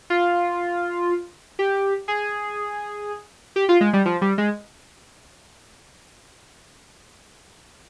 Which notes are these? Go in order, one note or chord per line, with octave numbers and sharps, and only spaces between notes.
F4
G4
G#4
G4
F4
G#3
G3
F3
G3
G#3